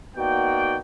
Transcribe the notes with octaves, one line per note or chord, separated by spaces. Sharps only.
A#3 B3 D#4 F#4 D5 G5